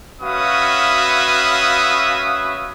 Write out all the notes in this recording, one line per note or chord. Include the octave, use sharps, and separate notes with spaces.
C#4 F#4 B4 E5 F5 D#6